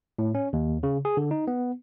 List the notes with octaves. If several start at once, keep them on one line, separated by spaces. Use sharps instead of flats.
A2
C#4
D#2
C#3
G#4
D3
D#4
B3